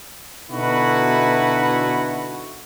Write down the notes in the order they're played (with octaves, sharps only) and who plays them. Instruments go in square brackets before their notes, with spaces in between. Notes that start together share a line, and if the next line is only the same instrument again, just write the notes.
[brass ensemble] B2 D3 D#4 E4 F#4 B4